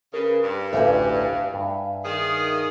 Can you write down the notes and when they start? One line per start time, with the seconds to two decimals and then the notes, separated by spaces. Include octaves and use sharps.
0.14 C#3 A#4 B4
0.43 G2
0.73 A1 D2 E5 F5 G#5
1.54 G2
2.04 D#3 G#4